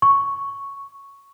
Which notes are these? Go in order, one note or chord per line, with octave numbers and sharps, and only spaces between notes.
C#6